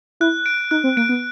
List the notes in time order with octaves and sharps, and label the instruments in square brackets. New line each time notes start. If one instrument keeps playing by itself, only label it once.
[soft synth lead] E4 [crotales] F#6
[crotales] D7
[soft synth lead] D#4 [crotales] F#6
[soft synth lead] C4
[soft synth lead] A#3 [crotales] D7
[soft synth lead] B3